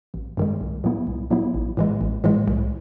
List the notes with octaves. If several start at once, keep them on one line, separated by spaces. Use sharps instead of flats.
A1
G2 D#3 G#3
C2
A#2 F#3 B3 E4
C2
A#2 F#3 B3 E4
A1
A2 E3 G#3
A1
A2 E3 G#3
C2